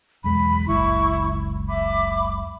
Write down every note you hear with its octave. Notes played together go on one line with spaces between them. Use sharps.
B1 E2 G#3 B5
F#1 C#2 E4 C#6
E5 B5 D6